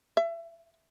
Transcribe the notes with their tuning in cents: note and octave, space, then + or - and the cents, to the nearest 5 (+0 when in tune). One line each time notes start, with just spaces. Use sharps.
E5 +25